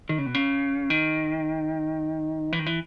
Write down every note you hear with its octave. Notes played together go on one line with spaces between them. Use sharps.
D#3
C#3
B2
C#3
D#3
E3
D#3
E3